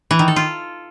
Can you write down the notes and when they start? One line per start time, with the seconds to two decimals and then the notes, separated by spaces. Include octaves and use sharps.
0.11 E3
0.19 D#3
0.28 A4
0.36 F4